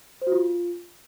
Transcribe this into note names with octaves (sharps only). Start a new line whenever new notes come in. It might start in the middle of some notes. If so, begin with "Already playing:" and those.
C5
F#4
F4